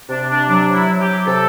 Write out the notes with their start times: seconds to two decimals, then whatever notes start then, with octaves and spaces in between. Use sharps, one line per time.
0.10 C3 D4
0.30 D4
0.48 F#3 D4
0.74 E4
0.88 F#3
1.00 G4
1.26 C3 A4